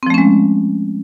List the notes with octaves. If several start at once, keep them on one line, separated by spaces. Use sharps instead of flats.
F3 G#3 A3 C4 C#4